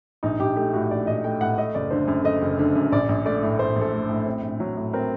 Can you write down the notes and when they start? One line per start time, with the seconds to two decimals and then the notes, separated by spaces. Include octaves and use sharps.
0.23 A#1 D#4
0.40 A#1 G4
0.56 A3 G4
0.73 A2 F#4
0.91 A#1 D5
1.07 A#1 D#5
1.24 A3 G5
1.41 A2 F#5
1.58 A3 D#5
1.75 F#1 D5
1.91 D3 C5
2.07 F#2
2.24 A3 D#5
2.42 F#1
2.59 D3
2.75 F#2
2.92 A#1 D5
3.09 A#1
3.25 A3 D5
3.42 A2
3.59 A#1 C5
3.76 A#1
3.81 A4
3.93 A3
4.09 A2
4.26 C4
4.42 A#1
4.60 F#3
4.77 A2
4.93 C4 A#4